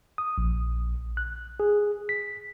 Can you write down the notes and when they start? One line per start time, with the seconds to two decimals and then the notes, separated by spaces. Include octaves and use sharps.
0.18 D#6
0.38 A#1
1.17 F#6
1.60 G#4
2.09 B6